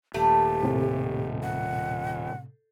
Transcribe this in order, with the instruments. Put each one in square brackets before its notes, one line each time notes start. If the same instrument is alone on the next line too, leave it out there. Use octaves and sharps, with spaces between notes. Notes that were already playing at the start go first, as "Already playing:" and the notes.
[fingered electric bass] D#1 [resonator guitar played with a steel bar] A3 [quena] G4
[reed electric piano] A2 C3
[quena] F#5